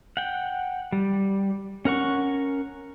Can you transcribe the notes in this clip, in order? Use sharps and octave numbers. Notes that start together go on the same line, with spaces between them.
F#5 G5
G3
C#4 A#4 F#5 C#6